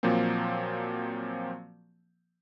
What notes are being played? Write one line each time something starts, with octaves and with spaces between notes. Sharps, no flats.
A#2 F3 F#3 A#3 C4